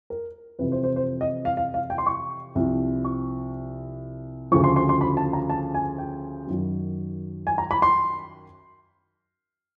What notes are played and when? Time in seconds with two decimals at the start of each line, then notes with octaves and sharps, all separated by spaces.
0.10 A#4
0.59 F2 C3 E3 B4
0.72 C5
0.84 C5
0.96 C5
1.21 D#5
1.45 F5
1.57 F5
1.74 F5
1.90 G5
1.98 C6
2.06 C#6
2.55 C2 C3 F3
3.05 C#6
4.52 D2 C#3 F3 C#6
4.64 C6
4.76 C6
4.89 C6
5.01 B5
5.17 A5
5.33 A#5
5.50 A5
5.74 G#5
5.98 G5
6.47 F#2 D#3 F#3
7.47 G#5
7.58 A#5
7.71 B5
7.82 C6